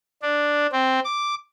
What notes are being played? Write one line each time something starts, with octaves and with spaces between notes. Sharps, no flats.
D4
C4
D6